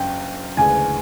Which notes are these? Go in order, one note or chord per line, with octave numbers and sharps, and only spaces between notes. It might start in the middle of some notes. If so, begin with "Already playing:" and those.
Already playing: F#1 F#2 G5
D2 C#3 E3 G#3 G#5